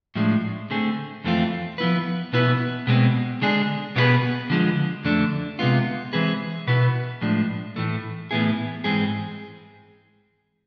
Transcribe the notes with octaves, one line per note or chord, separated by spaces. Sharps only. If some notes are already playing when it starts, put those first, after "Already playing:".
A2 F3 G#3 D4
D3 A3 C4 G#4
F2 E3 A3 C4 F4
F3 B3 E4 B4
B2 B3 E4 B4
B2 G#3 C4
D3 G#3 D4 G#4
B2 B3 F4 G#4 B4
D3 F3 G#3
F2 D3 A3 D4
C3 G#3 B3 F4
E3 G#3 C4 G#4 B4
B2 B3 E4 B4
A2 F3 G#3 D4
A2 E3 A3
A2 E3 B3 E4 G#4
G#2 E3 G#3 C4 G#4